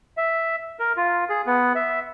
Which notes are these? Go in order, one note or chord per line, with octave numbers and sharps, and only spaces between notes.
E5
A#4
F4
G#4
B3
E5